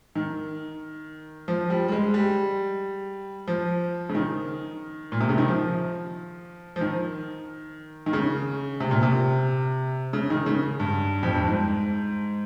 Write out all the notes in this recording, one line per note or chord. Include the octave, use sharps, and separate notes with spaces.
D#3
F3
G3
G3
G#3
G3
F3
C#3
D#3
A#2
C3
C#3
D#3
F3
F3
D#3
D#3
C#3
C3
A#2
C3
C#3
D#3
C#3
G2
F2
G2
G#2